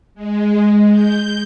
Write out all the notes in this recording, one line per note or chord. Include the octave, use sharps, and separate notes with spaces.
G#3
G6